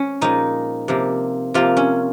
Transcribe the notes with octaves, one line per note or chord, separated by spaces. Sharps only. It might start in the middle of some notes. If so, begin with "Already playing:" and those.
Already playing: C#4
A#2 F3 G#3 D#4
C3 F3 A#3
C3 F3 A#3 F4
C#4